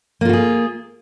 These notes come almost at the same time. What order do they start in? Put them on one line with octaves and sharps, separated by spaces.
A#3 F4 F#4 G#4